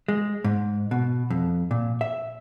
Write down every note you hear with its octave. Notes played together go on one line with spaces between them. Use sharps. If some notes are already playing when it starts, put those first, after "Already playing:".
G#3
G#2
B2
F2
A#2
E5